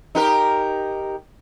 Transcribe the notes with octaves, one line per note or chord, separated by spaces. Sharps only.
D#4 G4 A#4